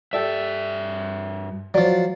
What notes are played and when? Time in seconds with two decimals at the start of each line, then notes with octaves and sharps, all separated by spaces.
0.13 G2 G4 A4 D5 E5
1.74 F3 F#3 D5